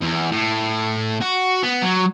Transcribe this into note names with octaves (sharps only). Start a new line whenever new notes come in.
E2
A2
F#4
B3
F#3